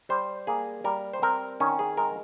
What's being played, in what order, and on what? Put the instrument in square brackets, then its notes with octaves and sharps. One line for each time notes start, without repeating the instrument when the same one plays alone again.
[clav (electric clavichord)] G3 C5
A#3 G#4
G3 A#4
C5
C4 A#4
D#3 C#4
G#4
G#3 A#4